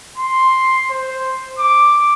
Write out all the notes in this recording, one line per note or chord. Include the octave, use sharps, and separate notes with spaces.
C6
C5
D6